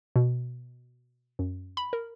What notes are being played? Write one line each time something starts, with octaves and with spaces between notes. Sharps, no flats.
B2
F#2
B5
A#4